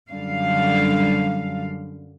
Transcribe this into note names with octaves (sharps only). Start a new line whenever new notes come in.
F#2 D3 G3 F5